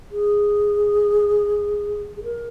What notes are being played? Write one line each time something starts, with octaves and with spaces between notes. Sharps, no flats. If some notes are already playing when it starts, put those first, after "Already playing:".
G#4
G#4
A#4